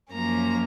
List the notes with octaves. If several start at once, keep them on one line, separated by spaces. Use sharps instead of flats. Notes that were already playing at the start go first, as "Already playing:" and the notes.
F#2 F3 A#3 C#4 A#5